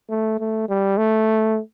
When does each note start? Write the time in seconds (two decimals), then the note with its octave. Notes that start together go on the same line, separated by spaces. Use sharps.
0.10 A3
0.39 A3
0.69 G3
0.98 A3